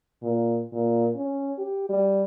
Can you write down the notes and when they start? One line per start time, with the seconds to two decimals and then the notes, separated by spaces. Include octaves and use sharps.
0.22 A#2
0.72 A#2
1.15 C#4
1.58 G4
1.89 G3